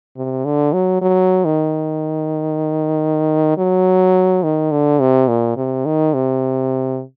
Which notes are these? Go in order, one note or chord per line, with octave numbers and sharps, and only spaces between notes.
C3
D3
F#3
F#3
D#3
F#3
D#3
D3
C3
A#2
C3
D#3
C3